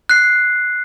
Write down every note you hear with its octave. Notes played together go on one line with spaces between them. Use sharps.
F#6 C7